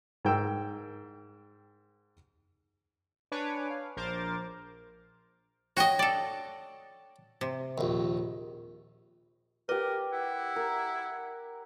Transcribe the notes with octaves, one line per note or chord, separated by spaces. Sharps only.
G#2 A#4 G5 E6
D4 B4 C#5 G#5 D6
F5
A#1 A#4 C5 D6 A6
F#4 C#5 D#5 G5 C#6
A4 D5
C3
A#1 D#2
G4 A#4 B4 D5
E4 F#5
A#4